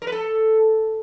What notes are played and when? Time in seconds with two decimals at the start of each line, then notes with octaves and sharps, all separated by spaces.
0.02 A#4
0.07 B4
0.12 A4